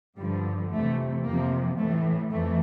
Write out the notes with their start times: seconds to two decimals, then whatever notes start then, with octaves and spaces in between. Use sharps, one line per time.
0.17 G2 D3 F3 G3
0.70 F2 C3 E3 A3
1.24 F2 C3 F3 A#3
1.78 A2 E3 A3
2.31 F2 E3 A3